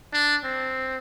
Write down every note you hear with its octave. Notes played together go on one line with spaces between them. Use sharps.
D4
C4